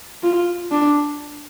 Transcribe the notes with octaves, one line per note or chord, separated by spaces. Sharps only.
F4
D4